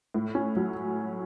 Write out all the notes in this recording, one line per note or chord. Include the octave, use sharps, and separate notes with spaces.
A2
C#4
F#3